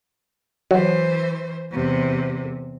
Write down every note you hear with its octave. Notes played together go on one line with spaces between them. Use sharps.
E3 F#3 C5
E2 C3